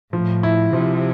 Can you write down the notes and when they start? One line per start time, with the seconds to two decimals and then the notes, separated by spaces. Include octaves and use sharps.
0.13 A2 F3
0.43 E4
0.72 C3 F3